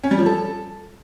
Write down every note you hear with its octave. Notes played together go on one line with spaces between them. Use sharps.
C#4
G3
F3
A4